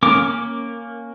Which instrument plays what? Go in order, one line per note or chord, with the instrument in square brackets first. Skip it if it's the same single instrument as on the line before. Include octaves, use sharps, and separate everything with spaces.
[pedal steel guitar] A#3 C#4 A#4 D6